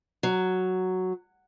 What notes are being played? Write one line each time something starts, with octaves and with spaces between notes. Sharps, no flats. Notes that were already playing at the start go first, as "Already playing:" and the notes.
F#3